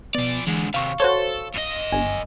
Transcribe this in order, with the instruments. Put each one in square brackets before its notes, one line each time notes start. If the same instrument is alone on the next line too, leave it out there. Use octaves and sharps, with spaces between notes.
[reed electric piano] B2 B3 [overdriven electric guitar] F3 D5
[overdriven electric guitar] D3 G#3 [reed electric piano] E3
[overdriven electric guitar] D#2 C3 [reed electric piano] F5 C#6
[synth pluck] F#4 C5 C#5 [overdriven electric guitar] A4
[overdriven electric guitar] F#2 D#5
[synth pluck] G1 [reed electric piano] G#5